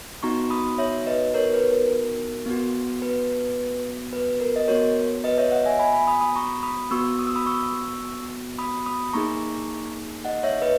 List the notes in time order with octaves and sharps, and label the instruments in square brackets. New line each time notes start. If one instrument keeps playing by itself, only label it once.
[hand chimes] B3 D#4 F#4 A#5 C#6
B5 D#6
C#5 E5
B4 D#5
A#4 C#5
B4
A#4
B3 F#4
B4
B4
A#4
D#5
B3 F#4 A#4 C#5
B4 D#5
C#5 E5
D#5 F#5
E5 G#5
G#5 B5
G#5 B5
B5 D#6
B5 D#6
A#5 C#6
B5 D#6
B3 F#4 C#6 E6
D#6
E6
B5 D#6
C#6 E6
B5 D#6
B5 D#6
A#3 D#4 G#4 A#5 C#6
D#5 F#5
C#5 E5
B4 D#5